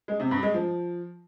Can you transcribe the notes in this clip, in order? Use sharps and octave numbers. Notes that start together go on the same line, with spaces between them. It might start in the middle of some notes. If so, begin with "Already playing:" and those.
G#3
C3
G2
G#3
F3